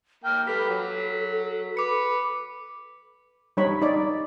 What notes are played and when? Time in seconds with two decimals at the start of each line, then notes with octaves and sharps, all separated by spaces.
0.24 A#3 G5 F6
0.47 G4 A4 B4 B6
0.69 F#3
1.77 B4 D6 C#7
3.57 G3 D#4 C#5 B5
3.81 D#4 D5